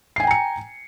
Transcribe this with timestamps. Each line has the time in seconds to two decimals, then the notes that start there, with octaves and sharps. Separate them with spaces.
0.16 C7
0.20 G#5
0.23 G5
0.27 A#5
0.31 C#7